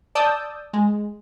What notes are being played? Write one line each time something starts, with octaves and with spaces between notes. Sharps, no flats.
D5 A5 D#6 E6 G6
G#3